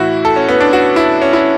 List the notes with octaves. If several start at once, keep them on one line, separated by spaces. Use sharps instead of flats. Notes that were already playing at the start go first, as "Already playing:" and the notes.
Already playing: A2 E3 E4 F#4
A4
C#4
B3
D4
F#4
E4
C#4
E4